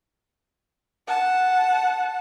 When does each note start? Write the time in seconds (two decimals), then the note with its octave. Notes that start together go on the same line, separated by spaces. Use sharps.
1.08 F#5 A5